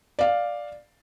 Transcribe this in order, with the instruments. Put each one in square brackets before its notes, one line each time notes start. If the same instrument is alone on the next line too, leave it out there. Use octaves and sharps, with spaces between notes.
[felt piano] D5 F5